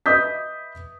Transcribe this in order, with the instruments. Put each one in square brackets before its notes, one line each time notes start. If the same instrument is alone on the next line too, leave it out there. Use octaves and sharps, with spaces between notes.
[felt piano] B4 D#5 E5 D#6 G6 B6